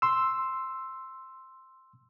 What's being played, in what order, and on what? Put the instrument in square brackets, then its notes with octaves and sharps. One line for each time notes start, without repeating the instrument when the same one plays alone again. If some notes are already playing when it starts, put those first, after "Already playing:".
[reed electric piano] C6 E6